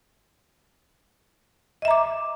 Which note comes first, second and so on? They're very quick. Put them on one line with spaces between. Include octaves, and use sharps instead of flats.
D#5 E5 A#5 D6